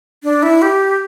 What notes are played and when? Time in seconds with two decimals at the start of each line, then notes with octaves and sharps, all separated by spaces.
0.23 D4
0.43 E4
0.62 G4